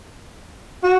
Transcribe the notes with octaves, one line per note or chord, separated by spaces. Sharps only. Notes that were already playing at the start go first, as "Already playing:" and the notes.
F#4